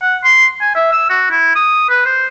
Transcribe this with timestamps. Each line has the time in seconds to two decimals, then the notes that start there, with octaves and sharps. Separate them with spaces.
0.01 F#5
0.24 C6
0.61 G#5
0.75 E5
0.92 E6
1.10 F#4
1.31 E4
1.55 D#6
1.89 B4
2.06 C5